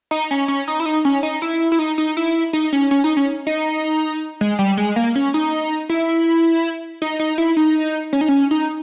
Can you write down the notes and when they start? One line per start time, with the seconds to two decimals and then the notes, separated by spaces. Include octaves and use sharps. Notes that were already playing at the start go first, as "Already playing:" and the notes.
0.11 D#4
0.31 C#4
0.48 C#4
0.68 D#4
0.80 E4
0.86 D#4
1.05 C#4
1.23 D#4
1.42 E4
1.72 E4
1.79 D#4
1.98 D#4
2.17 E4
2.53 D#4
2.73 C#4
2.91 C#4
3.04 D#4
3.17 C#4
3.47 D#4
4.41 G#3
4.59 G3
4.77 G#3
4.96 A#3
5.15 C#4
5.34 D#4
5.90 E4
7.02 D#4
7.19 D#4
7.38 E4
7.57 D#4
8.13 C#4
8.21 D#4
8.29 C#4
8.51 D#4